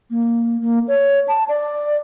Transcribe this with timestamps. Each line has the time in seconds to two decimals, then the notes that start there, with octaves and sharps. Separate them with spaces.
0.11 A#3
0.61 A#3
0.88 C#5
1.28 A5
1.49 D5